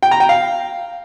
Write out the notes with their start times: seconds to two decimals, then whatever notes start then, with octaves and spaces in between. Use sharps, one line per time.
0.03 G5
0.11 A#5
0.20 G5
0.29 F5